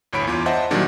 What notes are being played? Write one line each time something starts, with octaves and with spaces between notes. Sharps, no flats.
G1 D2 A2 C#5 B5 D7
E2 F4 C6 D6
C5 D#5 E5 F#5 A5
A#2 D#3 F#3 G3 D4